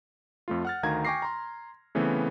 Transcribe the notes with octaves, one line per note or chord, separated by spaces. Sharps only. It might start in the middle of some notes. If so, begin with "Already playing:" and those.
F2 A3 F4
F#5 F6 A6
D2 D#3 F5 A#5 G#6
G5 G#5 C#6 D6 A#6 C7
A#5 C6
C#3 E3 A3 B3 C4